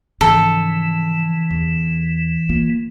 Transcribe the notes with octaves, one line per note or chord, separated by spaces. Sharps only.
G#2 C#3 E3 F3 A4
E2
A#3 F4